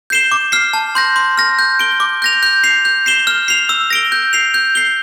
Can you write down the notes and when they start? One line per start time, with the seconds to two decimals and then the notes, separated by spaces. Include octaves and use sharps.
0.10 G6 C7 E7 G7
0.32 D6
0.52 F6 C7
0.73 A5
0.95 C6 G6 A#6
1.16 C6
1.37 F6 A#6
1.59 G6
1.79 D7 G7
2.00 D6
2.22 G6 A#6 F7
2.43 G6
2.64 C7 F7
2.85 G6
3.06 C7 E7 G7
3.27 F6
3.48 C7 F7
3.69 E6
3.90 A#6 D7 G7
4.12 G6
4.33 C7 F7
4.54 G6
4.75 C7 G7